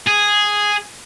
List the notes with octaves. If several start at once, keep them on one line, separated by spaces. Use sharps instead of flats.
G#4